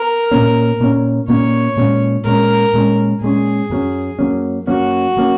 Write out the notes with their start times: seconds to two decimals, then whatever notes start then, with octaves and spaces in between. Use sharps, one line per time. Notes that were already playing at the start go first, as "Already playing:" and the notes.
Already playing: A#4
0.31 A#2 A#3 C#4
0.80 A#2 A#3 C#4
1.28 A#2 A#3 C#4 C#5
1.77 A#2 G#3 C#4
2.25 A#2 G#3 C#4 A#4
2.74 A#2 G#3 C#4
3.22 A#2 G#3 C#4 G#4
3.70 F#2 F#3 A#3 C#4
4.19 F#2 F#3 A#3 C#4
4.67 F#2 F#3 A#3 C#4 F#4
5.17 F#3 A#3 C#4